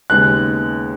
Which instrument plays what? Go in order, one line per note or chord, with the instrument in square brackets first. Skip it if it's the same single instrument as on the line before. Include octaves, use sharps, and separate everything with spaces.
[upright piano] D#2 C#3 G#3 B3 F#6